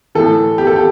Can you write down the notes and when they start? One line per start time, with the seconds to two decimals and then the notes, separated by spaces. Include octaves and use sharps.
0.15 A2 E3 A4
0.58 G4
0.67 A4
0.76 G4